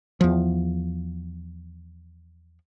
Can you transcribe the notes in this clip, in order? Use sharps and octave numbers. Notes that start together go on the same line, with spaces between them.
E2 F3